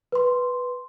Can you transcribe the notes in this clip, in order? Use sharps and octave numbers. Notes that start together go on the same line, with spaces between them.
B4 C6